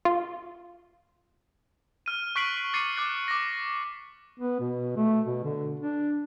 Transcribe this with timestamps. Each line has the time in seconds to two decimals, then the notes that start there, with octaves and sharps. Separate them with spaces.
0.05 F4
2.06 F6 D#7
2.36 C#6 F#6 B6 C7 D7 F#7
2.73 D6 A6 C7 C#7 D#7
2.96 D6 F#6 A6
3.28 D6 A#6
4.40 B3
4.60 B2
4.97 A3
5.26 B2
5.44 D3
5.80 D4